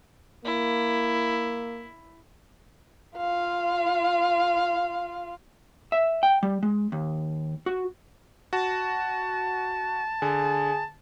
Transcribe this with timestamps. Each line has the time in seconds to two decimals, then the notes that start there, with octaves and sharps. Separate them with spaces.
0.45 A#3 E4
3.17 F4 F5
5.92 E5
6.23 G5
6.43 G3
6.63 G#3
6.92 D#2
7.66 F#4
8.53 F#4 A5
10.22 D3 G#4